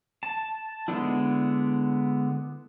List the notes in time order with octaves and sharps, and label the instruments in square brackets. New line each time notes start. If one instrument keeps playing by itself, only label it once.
[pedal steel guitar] A5
D3 G#3 B3 D4 E4